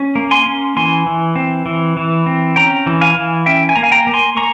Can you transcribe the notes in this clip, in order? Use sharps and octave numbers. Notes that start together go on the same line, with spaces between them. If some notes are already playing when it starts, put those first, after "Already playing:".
Already playing: C#4
A#3
G#5 C6
C#4
E3 G#5 C6
E3
C4
E3
E3
C4
C#4 G5 A#5
E3
F5 G#5
E3
C#4 E5 G5
G#5
A#3 A#5
F5 G#5
G5 A#5
A#3
G#5 C6
A#3 A#5 C#6